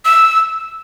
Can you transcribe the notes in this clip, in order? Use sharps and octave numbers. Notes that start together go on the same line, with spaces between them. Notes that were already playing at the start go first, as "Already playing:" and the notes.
E6